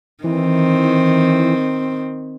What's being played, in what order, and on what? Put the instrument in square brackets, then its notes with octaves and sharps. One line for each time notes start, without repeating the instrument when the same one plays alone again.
[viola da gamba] D#3 C4 [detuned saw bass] E3